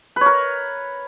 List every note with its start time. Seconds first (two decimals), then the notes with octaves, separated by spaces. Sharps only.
0.16 B4
0.21 C#5
0.26 A#4